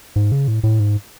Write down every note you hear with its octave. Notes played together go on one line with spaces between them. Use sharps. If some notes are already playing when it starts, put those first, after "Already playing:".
G#2
C#3
A2
A2
G#2